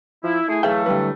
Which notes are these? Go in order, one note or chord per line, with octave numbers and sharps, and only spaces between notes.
F3 E4
A3 E4 G#4
E3 F#3 A3 G#4 E5 F5 G5
D3 G3 B4